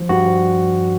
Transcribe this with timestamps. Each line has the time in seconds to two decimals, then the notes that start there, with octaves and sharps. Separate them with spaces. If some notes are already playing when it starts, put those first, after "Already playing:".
Already playing: F3
0.09 G2 F#4
0.26 F3